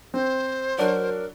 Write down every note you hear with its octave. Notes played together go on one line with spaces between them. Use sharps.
C4 C5
F#3 D4 F#4 A#4